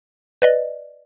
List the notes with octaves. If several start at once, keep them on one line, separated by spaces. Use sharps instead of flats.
B4 D5 D#5